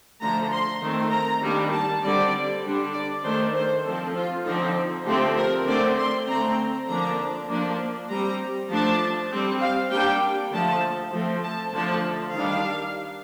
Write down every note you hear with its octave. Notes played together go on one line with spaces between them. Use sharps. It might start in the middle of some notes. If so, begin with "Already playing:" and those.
D3 F3 A3 A#5
C6
D#3 A3 C4
A#5
D#3 G3 A#3 D4
A5
D3 G3 C4 D5
D3 G3 D4
D5
D#3 A3 D4 C5
C5
F3 C4 A4
F4
D3 F3 C4 D#4
D3 F3 A3 C4 G4
A#4
D3 A3 C4 D5
C6
D3 A3 C4 A#5
D3 F3 A#3 D4 A#5
F3 A#3 D4
G3 C4 A#5
F3 A3 D4 A5
G3 C4
F5
G3 A#3 D4 G5
D3 F3 A3 A5
F3 A3 C4
A5
D3 F3 A3 D4 A5
D#3 G3 D4 F5